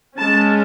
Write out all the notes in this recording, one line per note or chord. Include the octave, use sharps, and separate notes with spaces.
G#3 C#4 A5